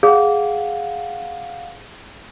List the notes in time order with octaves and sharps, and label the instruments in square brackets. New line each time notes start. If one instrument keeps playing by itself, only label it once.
[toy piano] G#4 [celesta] F5 F#5